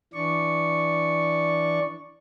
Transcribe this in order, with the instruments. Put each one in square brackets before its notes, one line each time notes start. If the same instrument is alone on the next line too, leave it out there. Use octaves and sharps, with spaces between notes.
[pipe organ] E3 D4 D5 C#6